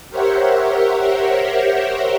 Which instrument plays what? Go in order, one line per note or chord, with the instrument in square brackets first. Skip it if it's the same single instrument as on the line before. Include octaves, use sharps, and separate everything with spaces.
[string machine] G4 A#4 C5 C#5 E5 F#5